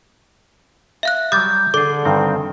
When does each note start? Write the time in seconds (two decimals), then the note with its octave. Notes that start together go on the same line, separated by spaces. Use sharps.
1.03 E5 F5 F#6
1.32 F#3 G3 D6 D#6 G6 A6
1.74 D3 G#4 A4 D5 D6
2.05 G2 D#3 C4